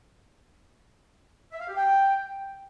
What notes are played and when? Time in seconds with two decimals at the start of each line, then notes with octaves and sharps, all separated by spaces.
1.52 E5
1.60 F5
1.68 G4
1.76 G5